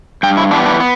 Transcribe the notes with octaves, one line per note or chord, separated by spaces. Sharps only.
G2 G5
E4
E3 G3 B3 D4
D4
B3